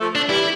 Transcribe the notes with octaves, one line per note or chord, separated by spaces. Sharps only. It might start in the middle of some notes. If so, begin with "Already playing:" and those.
F3 A3
D4
E3 G3 E4